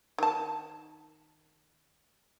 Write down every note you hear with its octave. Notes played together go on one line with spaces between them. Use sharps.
D#3 A5